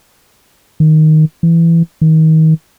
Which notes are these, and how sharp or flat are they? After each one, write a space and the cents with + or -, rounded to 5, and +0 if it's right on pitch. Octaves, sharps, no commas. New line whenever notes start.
D#3 +0
E3 +15
D#3 +30